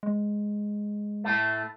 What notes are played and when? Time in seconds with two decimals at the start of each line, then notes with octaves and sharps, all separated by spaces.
0.03 G#3
1.24 A2 A3